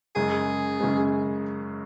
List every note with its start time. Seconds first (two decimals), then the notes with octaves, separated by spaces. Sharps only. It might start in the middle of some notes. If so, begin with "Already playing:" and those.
0.15 F#2 C#3 G#3 G#4
0.81 F#2 C#3 G#3